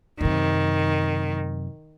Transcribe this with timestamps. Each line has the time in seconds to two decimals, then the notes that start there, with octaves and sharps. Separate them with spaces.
0.21 F#2 C3 D#3